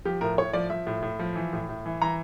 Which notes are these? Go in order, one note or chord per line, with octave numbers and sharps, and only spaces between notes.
F3 G4
A2 A#4
A2 C#5
F3 D5
F3 E5
A2
A2
F3
E3
A2
A2
E3
E3 A#5